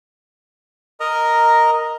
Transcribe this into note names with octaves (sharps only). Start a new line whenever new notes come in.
A#4 D#5 A#5